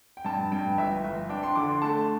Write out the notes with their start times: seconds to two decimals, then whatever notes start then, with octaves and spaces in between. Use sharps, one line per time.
0.17 G5
0.25 G2 A5
0.52 G2 G5
0.77 G1 E5
1.04 G1
1.29 D4 G5
1.43 C6
1.55 D3 D6
1.68 C6
1.82 A3 A5